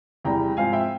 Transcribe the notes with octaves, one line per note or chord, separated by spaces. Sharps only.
E2 C3 E3 G3 G5 A#5
G#2 F3 C4 F5 G#5
E5 G5